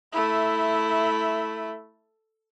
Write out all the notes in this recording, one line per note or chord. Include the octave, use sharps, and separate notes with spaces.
A3 E4